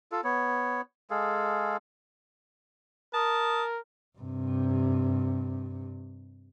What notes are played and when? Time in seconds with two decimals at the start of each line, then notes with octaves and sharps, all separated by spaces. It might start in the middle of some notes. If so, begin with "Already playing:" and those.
0.12 F4 A4
0.24 B3 C#5
1.10 G#3 G#4 A4 F5
3.14 A#4 A5 D#6
4.18 G2 C3